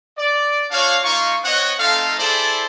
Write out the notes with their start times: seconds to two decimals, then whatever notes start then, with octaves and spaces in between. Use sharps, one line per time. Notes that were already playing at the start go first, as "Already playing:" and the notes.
0.17 D5
0.70 D4 F#4 C#5 F5
1.03 A#3 D#4 F4 F5 C#6
1.43 C4 C#5 D#5 F#5
1.79 A3 C4 D#4 A4 F5
2.18 E4 G#4 A4 C5 D5 A5